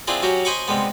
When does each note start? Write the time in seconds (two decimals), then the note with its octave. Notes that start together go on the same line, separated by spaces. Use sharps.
0.08 C4 D4 E4 F4 G#4
0.23 F#3 C#4 F#4 G4
0.45 C5 D#5 G#5 B5 C#6 D6
0.68 C3 G3 G#3 B3